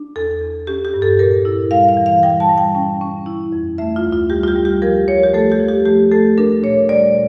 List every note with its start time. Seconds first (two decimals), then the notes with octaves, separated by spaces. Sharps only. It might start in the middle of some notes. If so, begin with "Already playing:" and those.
Already playing: D4
0.16 E2 A4
0.41 E2
0.67 C#4 G4
0.85 G4
0.94 G2
1.02 A4
1.19 A#2 A#4
1.45 E4
1.71 G3 F5
1.89 F5
1.97 E3
2.06 F5
2.23 G3 G5
2.40 A5
2.49 G3
2.58 G5
2.75 C#4
3.01 C#4
3.26 E4
3.52 F2
3.78 A3 E5
3.96 F4
4.04 D2
4.12 F4
4.30 G3 G4
4.43 F4
4.48 G4
4.56 G3
4.65 G4
4.82 F3 A#4
5.08 F3 C#5
5.24 G4
5.34 A3 A4
5.52 G4
5.60 F3
5.69 G4
5.85 A3 G4
6.11 A3 A4
6.38 D4 A#4
6.63 A#2 C#5
6.89 G3 D5